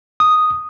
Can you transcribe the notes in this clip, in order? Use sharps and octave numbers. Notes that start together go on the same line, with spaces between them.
D#6